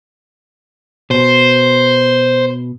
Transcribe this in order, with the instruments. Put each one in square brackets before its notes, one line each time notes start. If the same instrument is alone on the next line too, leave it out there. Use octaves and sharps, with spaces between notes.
[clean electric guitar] B2 [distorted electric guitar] C5